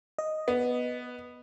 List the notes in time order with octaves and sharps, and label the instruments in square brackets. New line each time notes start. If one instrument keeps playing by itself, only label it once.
[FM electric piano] D#5
[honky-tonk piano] B3